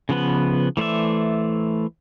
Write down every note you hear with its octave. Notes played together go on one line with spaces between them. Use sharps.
C#3 F3 B3 B4
E3 A3 C5 D5 E5